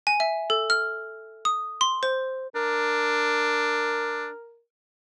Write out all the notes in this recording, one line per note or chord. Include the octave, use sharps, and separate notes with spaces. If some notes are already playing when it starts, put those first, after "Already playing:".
G#5
E5
A4
F6
D#6
C6
C5
D4 A#4